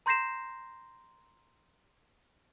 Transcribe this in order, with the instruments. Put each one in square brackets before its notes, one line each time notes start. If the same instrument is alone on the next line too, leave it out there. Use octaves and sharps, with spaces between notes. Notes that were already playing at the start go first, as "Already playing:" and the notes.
[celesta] A#5 C6 G6 A#6 C7 E7